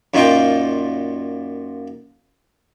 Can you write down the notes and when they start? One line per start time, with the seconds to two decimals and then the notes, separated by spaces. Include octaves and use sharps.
0.14 F#2 A#2 D#4 F4 G5